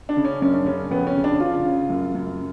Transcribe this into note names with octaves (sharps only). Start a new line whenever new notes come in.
D4
C#3
C#4
F#2 C#4
D4
C#3 C#4
F2 B3
C#4
C#3
D4
C#3 F4
C#3
F#2
F#2